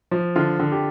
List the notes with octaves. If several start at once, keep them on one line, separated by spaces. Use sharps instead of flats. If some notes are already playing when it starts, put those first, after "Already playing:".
F3
D3 F4
D3
G4